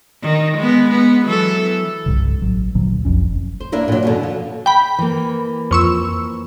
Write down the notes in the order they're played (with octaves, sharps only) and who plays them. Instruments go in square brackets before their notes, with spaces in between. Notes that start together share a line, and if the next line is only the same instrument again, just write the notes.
[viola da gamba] D#3
G#3 B3
B3
E3 F#3 A4
[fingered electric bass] C2 G2 C#3
A1 F#3
D2 A#2 F#3
F#1 B1 F2 C#4
[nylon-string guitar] C5
A#3 D4 E4 A#4 B4
A#2 F#3
F#2 B2 D3
F3
[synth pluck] G5 B5
[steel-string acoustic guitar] E3 A#3
[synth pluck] F2 C#6 E6